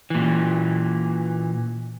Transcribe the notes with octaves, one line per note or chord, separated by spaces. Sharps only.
A#2 E3